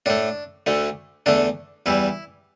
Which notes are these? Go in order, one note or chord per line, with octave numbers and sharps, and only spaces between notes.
A2 A3 D4
D2 D3 A3
E2 D3 A3 D4
E2 E3 G3 E4